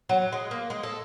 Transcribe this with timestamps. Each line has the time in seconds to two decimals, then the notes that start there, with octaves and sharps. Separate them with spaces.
0.09 F#3
0.32 G#3
0.51 A#3
0.70 G#3
0.83 A4